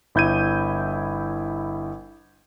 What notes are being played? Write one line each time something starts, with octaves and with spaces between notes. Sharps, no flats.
G1 E4 G6 G#6 D#7